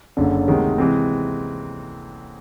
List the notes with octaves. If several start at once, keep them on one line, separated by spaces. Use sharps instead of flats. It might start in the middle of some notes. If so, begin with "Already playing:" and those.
F#1 F#2 D3
D2 C3 D#3 G#3
C3 E3 G#3 C4